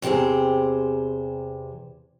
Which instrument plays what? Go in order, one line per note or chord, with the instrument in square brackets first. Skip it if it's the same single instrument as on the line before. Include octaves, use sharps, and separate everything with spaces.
[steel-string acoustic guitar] E2 C3 G4 G#4 C5